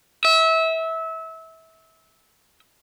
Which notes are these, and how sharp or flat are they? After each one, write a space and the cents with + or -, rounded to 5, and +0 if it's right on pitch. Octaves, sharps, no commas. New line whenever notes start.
E5 -25